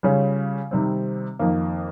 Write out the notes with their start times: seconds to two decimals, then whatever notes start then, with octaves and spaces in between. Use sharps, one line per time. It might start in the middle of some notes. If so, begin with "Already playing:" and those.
0.03 C#3 G3 C#4 F4
0.71 C3 D#3 G3 C4
1.39 F2 D#3 A#3